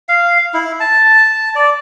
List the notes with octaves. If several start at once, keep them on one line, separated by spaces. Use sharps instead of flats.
F5
E4
A5
D5